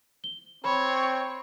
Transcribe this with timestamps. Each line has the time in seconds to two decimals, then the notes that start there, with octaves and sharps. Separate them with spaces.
0.24 G7
0.65 C4 C#5 B5